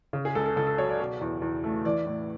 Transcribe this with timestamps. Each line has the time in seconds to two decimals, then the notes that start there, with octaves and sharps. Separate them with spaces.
0.13 C#3
0.25 G#4
0.35 C#2 A4
0.46 A4
0.56 C#2 A4
0.67 A4
0.78 F#3 C#5
0.89 D5
0.99 B2
1.21 E2
1.42 E2
1.64 A3
1.85 E3 D5
2.06 A2